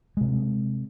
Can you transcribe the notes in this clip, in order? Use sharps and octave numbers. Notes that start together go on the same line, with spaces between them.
C3 G#3